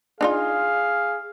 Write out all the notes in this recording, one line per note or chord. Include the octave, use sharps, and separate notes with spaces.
D4 D#4 F4 G#4 F5